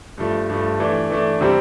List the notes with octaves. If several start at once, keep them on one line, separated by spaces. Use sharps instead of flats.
G2 F3 A3
G2 F3 A3
E3 A3 D4
E3 A3 D4
C3 G3 C4